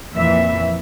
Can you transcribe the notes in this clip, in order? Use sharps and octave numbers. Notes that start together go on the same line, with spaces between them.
F2 A#2 E3 E5